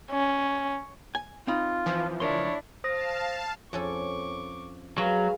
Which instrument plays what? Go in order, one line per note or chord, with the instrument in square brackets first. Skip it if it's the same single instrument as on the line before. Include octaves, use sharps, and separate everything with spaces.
[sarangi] C#4
[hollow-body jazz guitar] G#5
[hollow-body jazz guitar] C4 D#4 B5 [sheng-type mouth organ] F4
[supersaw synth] E3 F3
[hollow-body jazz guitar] C#2 A#4 C6 [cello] D4 E4 [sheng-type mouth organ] C#5
[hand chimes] C5 D#6 A#6 [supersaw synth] F5 A5
[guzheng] F2 C#4 A4 [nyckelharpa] C#6 D6
[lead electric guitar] F#3 [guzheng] G#3 [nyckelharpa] B4 F5